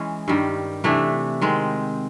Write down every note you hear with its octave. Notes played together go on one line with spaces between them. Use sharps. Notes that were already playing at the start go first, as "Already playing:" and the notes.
Already playing: E3 G#3 C#4
G2 D#3 G3
C3 E3 A3 D4
D#3 G#3 C4